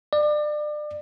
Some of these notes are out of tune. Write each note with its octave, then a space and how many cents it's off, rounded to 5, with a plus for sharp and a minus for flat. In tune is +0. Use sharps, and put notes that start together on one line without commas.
D5 +30